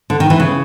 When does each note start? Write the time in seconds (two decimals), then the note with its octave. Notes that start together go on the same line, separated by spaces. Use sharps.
0.10 D3
0.20 D#3
0.30 E3
0.40 C#3